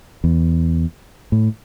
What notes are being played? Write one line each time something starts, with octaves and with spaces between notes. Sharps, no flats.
E2
A2